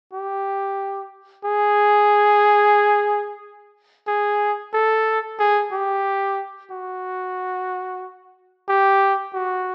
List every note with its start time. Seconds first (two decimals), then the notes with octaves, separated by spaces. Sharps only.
0.13 G4
1.45 G#4
4.08 G#4
4.74 A4
5.39 G#4
5.72 G4
6.71 F#4
8.69 G4
9.34 F#4